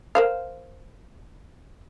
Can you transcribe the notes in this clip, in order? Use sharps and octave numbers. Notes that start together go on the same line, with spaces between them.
A#4 C5 F5